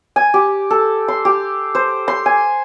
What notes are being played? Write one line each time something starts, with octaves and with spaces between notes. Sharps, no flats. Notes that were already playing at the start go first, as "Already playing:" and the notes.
G#5
G4
A4
C6
G4
C5
C6
G#5